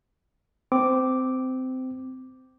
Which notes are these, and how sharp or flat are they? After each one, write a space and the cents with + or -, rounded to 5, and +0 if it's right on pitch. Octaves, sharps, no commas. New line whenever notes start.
C4 -20 D6 +0